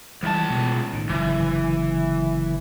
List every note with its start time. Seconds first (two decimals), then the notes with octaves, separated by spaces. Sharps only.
0.23 C#2 E3 G3 A5
0.50 B2
0.93 A2 D#3
1.09 F#1 D3 E3